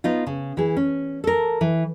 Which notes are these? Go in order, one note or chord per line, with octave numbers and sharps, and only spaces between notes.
B3 D#4 F4
C#3
E3 G#4
C#4
A4 A#4
E3